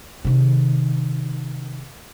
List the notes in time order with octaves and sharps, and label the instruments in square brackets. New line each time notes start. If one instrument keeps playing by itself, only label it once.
[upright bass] C3 D#3